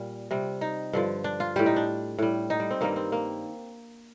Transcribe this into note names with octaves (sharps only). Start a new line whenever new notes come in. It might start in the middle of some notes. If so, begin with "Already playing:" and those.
Already playing: A#2 G3
C3 G3
D#4
G2 D3 F3
D4
F4
A2 G3 G4
D#4
D4
A2 G3
D#4
G3
C4
G2 D#3 G3 A#3
C4
A#3